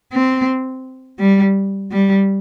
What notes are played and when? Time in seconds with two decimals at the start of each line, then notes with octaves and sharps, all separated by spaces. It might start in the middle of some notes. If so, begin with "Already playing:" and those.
0.13 C4
1.20 G3
1.92 G3